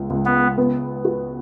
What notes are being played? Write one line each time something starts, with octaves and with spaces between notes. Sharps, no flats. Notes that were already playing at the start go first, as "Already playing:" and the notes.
Already playing: C#2
C#2
B3
B3
F#4